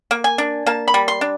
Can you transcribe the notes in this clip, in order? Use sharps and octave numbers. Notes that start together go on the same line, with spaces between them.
A#3
G#5
D4
A#3 A5
B5
G3
C6
D4